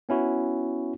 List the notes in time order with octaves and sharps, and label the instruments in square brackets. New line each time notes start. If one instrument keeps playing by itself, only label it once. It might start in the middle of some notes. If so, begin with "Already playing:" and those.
[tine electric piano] B3 C#4 E4 F#4